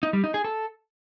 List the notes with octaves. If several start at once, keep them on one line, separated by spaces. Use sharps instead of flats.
D#4
G3
D#4
G#4
A4